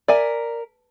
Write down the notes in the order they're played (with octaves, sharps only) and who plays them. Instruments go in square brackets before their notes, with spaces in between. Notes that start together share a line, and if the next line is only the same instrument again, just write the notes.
[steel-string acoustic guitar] A#4 [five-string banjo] D5 E5 G#5